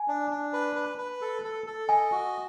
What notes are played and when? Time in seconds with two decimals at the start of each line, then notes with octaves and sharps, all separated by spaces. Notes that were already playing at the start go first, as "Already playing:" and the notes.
Already playing: G#5
0.08 D4
0.31 D4
0.53 B4
0.76 B4
0.98 B4
1.21 A4
1.44 A4
1.67 A4
1.88 D#5 G#5
2.12 F#4